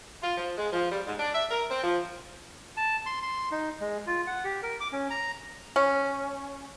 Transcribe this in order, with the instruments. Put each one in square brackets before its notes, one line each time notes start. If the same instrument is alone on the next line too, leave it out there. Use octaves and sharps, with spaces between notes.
[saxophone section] F4
F3
G#3
F3
G3
G#2
D4
E5
A#4
C4
F3
[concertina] A5
C6
C6
D#4
G#3
F4
F#5
G4
A#4
D6
C#4
A#5
[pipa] C#4